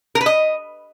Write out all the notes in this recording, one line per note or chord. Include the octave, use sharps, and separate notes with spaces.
A#4
B4
D#5